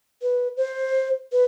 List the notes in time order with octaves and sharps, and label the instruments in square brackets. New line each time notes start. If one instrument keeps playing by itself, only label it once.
[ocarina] B4
C5
B4